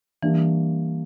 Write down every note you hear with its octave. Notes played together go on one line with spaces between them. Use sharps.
E3 G3 A#3 D4